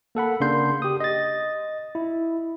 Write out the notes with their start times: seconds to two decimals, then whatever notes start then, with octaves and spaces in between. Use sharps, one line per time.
0.15 A#3 A4 F#5 B5
0.40 C#3 A#3 D4 C6 G6
0.82 G4 D#6
1.00 D#5 A6
1.95 E4